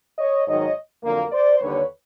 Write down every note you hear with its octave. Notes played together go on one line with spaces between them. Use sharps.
C#5 D#5
G#2 D#3 F#3 C#5 D#5
F2 D3 F#3 A#3
C5 D5
D#2 D3 G3 B4 C#5